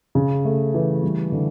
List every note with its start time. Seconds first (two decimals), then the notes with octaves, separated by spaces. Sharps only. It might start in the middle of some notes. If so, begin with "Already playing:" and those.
0.15 C#3
0.45 A3
0.74 E3
1.03 G3
1.32 D3